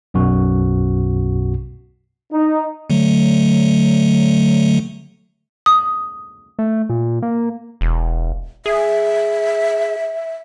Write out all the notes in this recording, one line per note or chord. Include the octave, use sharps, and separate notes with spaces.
B1 F#2 B2 F#4
D#4
D3 F#3 A3
D#6
A3
A#2
A#3
E1
G#4 E5